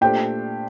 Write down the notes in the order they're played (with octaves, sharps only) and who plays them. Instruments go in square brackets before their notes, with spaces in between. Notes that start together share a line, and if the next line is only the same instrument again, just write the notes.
[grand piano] A#2 A3 D4 G4 C5 [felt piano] G5